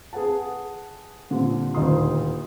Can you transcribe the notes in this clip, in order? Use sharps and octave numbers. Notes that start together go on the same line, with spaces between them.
G#4 B4 F#5 A5
A#2 D3 G3 C4
D#1 D2 D#4 F4 C6 D#6